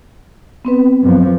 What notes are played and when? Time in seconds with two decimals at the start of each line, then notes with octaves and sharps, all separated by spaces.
0.65 B3 C4 B4
1.02 F#2 F3